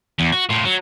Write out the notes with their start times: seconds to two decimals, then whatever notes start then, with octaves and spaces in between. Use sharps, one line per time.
0.19 E2
0.32 F#4
0.49 A2 F4
0.64 F#3